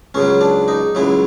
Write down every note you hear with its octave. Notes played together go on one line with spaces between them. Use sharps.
C#2 C#3 F#3 C#4
D4
D#4
C#2 C#3 F#3 E4